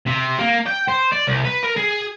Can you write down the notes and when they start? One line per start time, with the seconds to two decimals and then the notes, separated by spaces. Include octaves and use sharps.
0.06 C3
0.38 A#3
0.66 G5
0.88 C5
1.12 D5
1.27 C2
1.45 B4
1.63 A#4
1.77 G#4